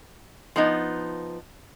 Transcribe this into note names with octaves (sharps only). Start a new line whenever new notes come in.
F3 B3 D#4